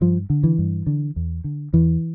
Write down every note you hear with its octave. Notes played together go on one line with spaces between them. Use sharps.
G2 F3
D3
E3
G2
D3
E2
D3
E2 E3